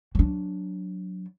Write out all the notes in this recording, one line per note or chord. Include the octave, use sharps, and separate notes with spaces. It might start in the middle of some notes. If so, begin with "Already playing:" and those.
F#3 D4